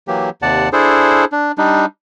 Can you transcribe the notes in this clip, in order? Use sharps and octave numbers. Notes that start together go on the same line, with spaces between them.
E3 F#3 A#3 G4
D#2 C3 D5 F#5 A5
D4 E4 G#4 A4 C5
D4
G3 D4 D#4